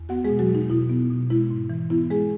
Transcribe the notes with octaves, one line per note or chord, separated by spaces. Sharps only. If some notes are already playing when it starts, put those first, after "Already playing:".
Already playing: E2
B3 F#4 F#5
B2 G#3 G#4
F#3 F#4
G#3
D#4
B2 E4
B3
B2
G#3 E4
G#2
E3
B3 E4
G#3 G#4